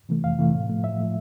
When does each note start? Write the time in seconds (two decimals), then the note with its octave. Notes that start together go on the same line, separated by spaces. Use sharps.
0.09 C3 E3 A3
0.24 F2 F5
0.39 C3 E3 A3
0.54 A2
0.69 F3 A3
0.84 A2 E5
1.00 F3 A3